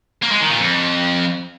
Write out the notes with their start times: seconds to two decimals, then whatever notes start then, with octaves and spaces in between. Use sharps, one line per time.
0.22 A#3
0.31 G#3
0.40 D#3
0.49 A#2
0.58 F2